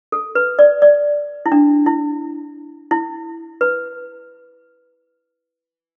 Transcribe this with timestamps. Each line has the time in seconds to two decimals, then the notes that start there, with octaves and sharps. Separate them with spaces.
0.12 A4
0.35 B4
0.59 D5
0.82 D5
1.46 E4
1.52 D4
1.86 E4
2.91 E4
3.61 B4